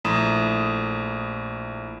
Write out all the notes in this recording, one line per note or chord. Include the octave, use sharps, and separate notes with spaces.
A#1 A3 E4 A#5 D#6 E7